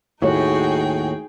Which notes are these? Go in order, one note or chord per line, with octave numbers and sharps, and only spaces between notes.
D#2 A2 D#4 F#4 G#4 C#5 G5